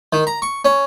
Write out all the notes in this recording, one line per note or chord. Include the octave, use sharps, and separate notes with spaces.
D#3
A#5
C#6
C#4